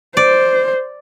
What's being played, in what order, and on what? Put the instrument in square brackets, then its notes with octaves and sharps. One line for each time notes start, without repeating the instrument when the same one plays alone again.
[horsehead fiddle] C5 [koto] D5